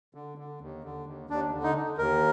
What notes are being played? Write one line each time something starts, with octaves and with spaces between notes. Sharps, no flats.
D3
D3
D#2
D3
D#2
D#2 D4
D3
D#4
D3
D#2 A#4